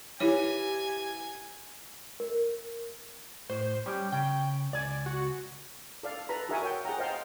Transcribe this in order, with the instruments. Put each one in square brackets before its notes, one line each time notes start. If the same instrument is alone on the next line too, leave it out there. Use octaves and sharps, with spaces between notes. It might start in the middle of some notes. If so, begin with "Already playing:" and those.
[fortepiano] E3 [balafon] E4 C#5 [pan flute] G4 [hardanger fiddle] G#5
[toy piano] A#4
[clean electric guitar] A2 [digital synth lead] C5
[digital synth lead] G3 [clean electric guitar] C#4 G4
[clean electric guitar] C#3 [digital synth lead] G5
[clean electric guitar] C#2 G#5 [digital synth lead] D5
[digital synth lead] F#4
[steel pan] A4 D5 F5
A4 B4 A#5 B5
F#4 G#4 A#4 E5 F#5 G#5
C#5 G5
G#4 F#5 G5 A#5
C5 D#5 F5 G5 A5 A#5